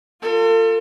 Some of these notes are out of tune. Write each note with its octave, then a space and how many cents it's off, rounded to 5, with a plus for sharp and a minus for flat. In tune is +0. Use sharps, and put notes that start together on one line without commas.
F4 +0 A4 +40